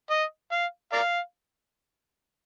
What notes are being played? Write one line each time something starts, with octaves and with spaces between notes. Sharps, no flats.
D#5
F5
A#4 D5 F5